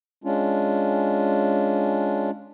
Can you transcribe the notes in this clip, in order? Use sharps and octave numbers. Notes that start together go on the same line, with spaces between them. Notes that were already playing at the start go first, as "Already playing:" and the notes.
G#3 C#4 D4 F4